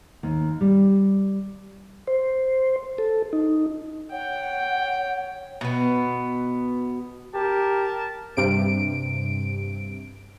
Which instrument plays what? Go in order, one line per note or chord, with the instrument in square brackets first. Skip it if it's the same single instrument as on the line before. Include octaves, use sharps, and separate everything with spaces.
[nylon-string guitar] D#2
G3
[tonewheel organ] C5
A4
D#4
[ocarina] C#5 [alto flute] F#5 [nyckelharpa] G5
[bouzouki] B2 B3
[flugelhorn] G4 [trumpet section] A#4 A5
[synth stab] G2 C3 D7